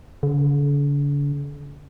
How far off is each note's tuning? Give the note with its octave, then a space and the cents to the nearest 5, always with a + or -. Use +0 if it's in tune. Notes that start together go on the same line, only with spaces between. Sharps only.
D3 -45